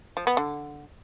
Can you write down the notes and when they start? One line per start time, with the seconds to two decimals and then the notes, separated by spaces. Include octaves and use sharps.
0.17 F3
0.27 B3
0.37 D3